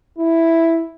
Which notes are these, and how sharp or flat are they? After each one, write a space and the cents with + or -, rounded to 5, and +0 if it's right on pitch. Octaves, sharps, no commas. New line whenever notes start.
E4 +0